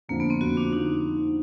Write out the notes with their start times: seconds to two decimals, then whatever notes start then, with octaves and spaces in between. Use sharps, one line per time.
0.08 F2 D3 F3 A#3
0.20 B3
0.30 C4
0.40 F2 D3 F3 F#4
0.57 D4
0.73 D3 F3 D#4